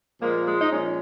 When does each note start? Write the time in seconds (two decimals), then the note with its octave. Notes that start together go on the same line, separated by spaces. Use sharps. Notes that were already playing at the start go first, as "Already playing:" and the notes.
0.20 A#2 F3 G#3 A#3
0.46 G#3
0.61 D#4
0.71 A#2 F3 G#3 C#4